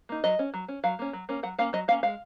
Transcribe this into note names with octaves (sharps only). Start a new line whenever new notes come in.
A#3 D#4
F#3 D#5
C#4
F#3
C#4
F#3 F5
A#3 C#4
F#3
A#3 C#4
F#3 F#5
A#3 C#4 F5
F#3 D#5
A#3 C#4 F5
G#3 F5